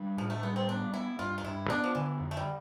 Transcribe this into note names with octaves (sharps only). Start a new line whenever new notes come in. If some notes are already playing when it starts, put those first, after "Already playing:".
Already playing: G3 D4
A2 F3
A3
G3 B3
C4
B3 D4
B3 E4
G2 F4
F4
G2 E4
B3 D4
F3
D3 E3
F2
A3
G3